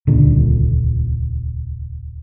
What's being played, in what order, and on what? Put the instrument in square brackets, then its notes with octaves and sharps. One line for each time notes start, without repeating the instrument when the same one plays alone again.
[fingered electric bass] D#1 C#2 A#2 D3